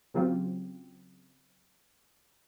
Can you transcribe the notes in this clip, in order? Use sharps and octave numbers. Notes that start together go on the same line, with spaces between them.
C#3 F#3 C4 F4 G4